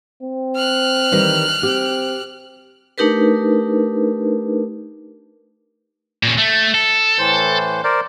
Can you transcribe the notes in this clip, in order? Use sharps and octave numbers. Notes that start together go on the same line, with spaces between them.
C4
F6 F#6
D#3 E3 G3
C4 G4
A3 D4 D#4 G4 A#4 B4
A#2 C#4
A3
A4
A2 E3 C5
A#4 C5 D5